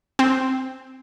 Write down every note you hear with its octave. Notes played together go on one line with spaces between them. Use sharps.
C4